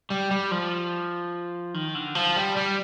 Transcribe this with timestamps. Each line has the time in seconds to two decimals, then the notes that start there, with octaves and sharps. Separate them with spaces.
0.10 G3
0.31 G3
0.51 F3
1.74 D#3
1.95 D3
2.15 F3
2.36 G3
2.57 G3